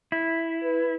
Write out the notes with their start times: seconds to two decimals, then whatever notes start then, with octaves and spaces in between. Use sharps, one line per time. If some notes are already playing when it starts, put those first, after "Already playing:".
0.12 E4
0.63 B4